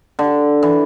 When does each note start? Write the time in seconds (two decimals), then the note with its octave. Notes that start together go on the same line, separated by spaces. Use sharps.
0.19 D3
0.63 E3